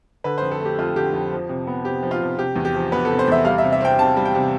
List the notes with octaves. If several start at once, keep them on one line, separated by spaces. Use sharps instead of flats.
D3 B4
F2 C5
A4
A3 G4
F2 F4
D3 G4
F2
F3
C3
B3
C3 G4
F3
F4
C3
C3 G4
E2
G4
F3
B3 B4
C3 A4
C5
E2 E5
G3 F5
E5
C3
E5
C4 G5
C3 A5
G3
G5
C3